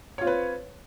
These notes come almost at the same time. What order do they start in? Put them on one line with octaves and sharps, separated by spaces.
C#5 F4 C4 B4